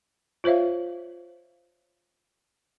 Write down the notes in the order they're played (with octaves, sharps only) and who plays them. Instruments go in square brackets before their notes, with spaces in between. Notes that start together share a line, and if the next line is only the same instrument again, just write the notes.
[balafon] F4 C5 C#5 E5 F5